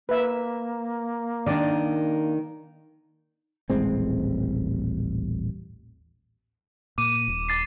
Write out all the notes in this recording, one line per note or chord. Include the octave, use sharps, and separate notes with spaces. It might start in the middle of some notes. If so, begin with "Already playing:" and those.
A#3 B4 E5
D#3 D4 D5
D#1 A1 G#3 C4
A#2 D6 D#7
D#1
D6 A6 C7